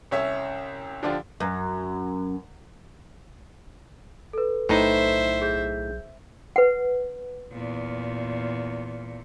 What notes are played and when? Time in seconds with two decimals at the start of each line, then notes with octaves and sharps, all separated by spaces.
0.11 C2 C#4 E5
1.03 D3 F3 D4 F4 G4
1.40 F#2
4.33 A4 B4
4.69 B1 A2 D#4 C5 E5
5.41 G#4 G6
6.56 B4 F#5
7.52 E2 A#2